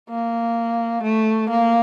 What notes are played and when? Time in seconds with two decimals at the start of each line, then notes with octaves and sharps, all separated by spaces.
0.10 A#3
1.03 A3
1.50 A#3